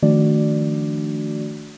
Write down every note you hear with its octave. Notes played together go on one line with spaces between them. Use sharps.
D#3 F3 A3 D4 F#4 D5